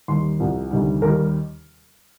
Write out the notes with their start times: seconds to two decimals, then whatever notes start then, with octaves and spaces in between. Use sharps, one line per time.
0.08 D#2 D#3 G3 C6
0.39 C2 C3 F3
0.71 D2 C3 D#3 G3
1.02 D#2 D#3 G3 A#4